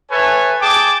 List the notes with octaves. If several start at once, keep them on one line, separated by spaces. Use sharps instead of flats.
A4 B4 C#5 E5 G#5
G#4 G5 A5 D6